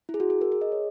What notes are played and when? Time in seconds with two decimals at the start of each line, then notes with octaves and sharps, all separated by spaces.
0.09 E4
0.14 G#4
0.20 F#4
0.30 G#4
0.41 A#4
0.52 G#4
0.61 D#5
0.72 C#5